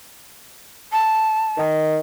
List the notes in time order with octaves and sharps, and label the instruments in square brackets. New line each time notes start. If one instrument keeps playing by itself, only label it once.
[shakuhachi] A5
[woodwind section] D#3